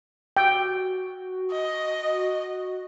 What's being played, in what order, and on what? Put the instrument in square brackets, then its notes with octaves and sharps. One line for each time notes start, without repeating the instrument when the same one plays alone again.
[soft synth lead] F#4 [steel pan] G5
[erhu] D#5